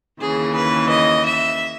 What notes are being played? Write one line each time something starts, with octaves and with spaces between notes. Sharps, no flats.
D#2 C#3 E3 G#4
B4
D#5
E5